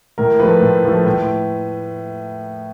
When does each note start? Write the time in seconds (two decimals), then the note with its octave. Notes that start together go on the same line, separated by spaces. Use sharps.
0.18 A2 A#4
0.40 F3 A3 B4
0.62 A2
0.85 F3 A3
1.06 A2